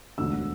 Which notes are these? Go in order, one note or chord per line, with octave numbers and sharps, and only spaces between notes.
E1 D2 D3 E6